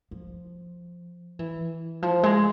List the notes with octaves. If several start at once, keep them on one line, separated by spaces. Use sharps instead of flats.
F3
E3
F3
G#3